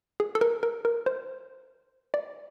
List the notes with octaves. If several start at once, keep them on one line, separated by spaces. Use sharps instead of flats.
G#4
A4
A#4
A#4
A#4
C5
D5